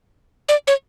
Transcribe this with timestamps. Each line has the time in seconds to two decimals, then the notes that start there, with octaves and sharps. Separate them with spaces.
0.49 D5
0.67 C#5